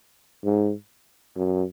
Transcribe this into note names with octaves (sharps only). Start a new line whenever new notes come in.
G#2
F#2